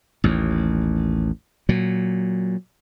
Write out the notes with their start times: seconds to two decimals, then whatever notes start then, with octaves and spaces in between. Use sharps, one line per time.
0.24 A1 D#2
1.69 A#2 F#3